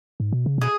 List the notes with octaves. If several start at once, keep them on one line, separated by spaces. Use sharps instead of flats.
G#2
B2
C#3
B2 G#4